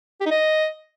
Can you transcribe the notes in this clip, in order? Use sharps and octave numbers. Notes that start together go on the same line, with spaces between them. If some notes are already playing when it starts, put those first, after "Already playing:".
G4
D#4
D#5